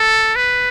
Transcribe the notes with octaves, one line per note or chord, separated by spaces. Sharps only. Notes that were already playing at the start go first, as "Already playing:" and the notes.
Already playing: A4
B4